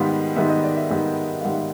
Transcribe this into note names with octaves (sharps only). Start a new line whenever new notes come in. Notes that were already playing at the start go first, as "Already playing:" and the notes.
Already playing: G#2 D#3 G3 B3 F5
G#2 D#3 G3 B3 E5
D#5
D5
E5
G#2 D#3 G3 B3
F5
G#2 D#3 G3 B3 F#5